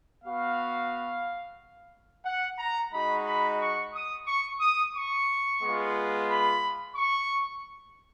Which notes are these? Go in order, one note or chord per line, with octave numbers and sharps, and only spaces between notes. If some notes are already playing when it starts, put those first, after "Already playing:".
B3 F#4 F5
F#5
A#5
G#3 D#4 F#4 B5
B5
C#6
D#6
C#6
D#6
C#6
G#3 B3 F4
B5
C#6